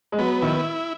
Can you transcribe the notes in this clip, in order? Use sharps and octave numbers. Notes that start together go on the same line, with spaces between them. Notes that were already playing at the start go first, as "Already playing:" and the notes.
G#3
F#3 B3
D#3 E4